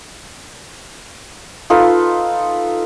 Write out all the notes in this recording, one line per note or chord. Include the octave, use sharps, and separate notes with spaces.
D#4 F4 A4 B4